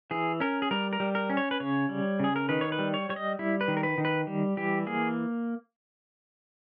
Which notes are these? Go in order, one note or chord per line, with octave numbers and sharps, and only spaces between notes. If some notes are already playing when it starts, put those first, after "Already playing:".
E3 G#4
C#4 A#4
G#4
G3 A#4
A#4
G3
A#4
C#4
C#5
B4
C#3 C#5
G3
C#3 G#4
A#4
D#3 B4
C#5
B4
G3
C#5
G3 C#5
D#5
G3 E4
B4
D#3
A#4
B4
D#3
B4
G3
E3 G4
A#3 G#4